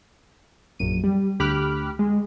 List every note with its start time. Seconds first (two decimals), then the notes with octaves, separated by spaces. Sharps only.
0.79 A#1 F#2 D#7
1.03 G3
1.40 D2 G4 B5 D6 F6 F#6
1.99 G#3